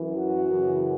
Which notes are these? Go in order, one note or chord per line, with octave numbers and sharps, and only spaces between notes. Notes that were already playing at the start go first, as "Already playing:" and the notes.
Already playing: F#2 E3
F#4
F#2 C#3 E3